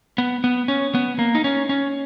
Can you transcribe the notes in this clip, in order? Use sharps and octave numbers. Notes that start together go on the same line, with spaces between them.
B3
B3
C#4
B3
A#3
D#4
C#4
C#4